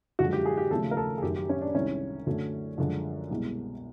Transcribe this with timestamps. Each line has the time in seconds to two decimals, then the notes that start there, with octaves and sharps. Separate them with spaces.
0.19 F#2 D3 F3 G#3 F#4
0.33 G4
0.45 G#4
0.57 G4
0.71 D#2 C#3 F3 A3 A4
0.91 A#4
0.97 A4
1.18 G#4
1.22 F#2 D#3 F#3 G4
1.36 G4
1.49 C#4
1.61 D4
1.75 C2 C3 D#3 G#3 C#4
2.26 F#2 D3 F#3 A3
2.78 F#2 D3 F3 G#3
3.30 C2 B2 G#3